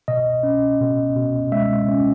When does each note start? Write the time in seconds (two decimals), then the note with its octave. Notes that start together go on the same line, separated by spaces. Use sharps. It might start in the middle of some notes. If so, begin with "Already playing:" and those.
0.08 B2 D#5
0.43 C#4
0.80 B2
1.16 B2
1.52 G#3 E5
1.89 C#4